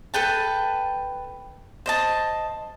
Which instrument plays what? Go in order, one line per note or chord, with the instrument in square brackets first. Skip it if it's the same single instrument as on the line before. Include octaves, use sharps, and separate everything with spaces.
[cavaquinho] A4 B4 G5 A5
C5 D#5 A5